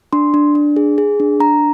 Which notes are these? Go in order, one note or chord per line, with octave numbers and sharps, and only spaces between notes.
D4 C6
D4
D4
G#4
G#4
D4
D4 A#5